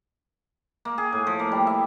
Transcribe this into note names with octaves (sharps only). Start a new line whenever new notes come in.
A#3
G#4
A2
F3
A#3
G3
E5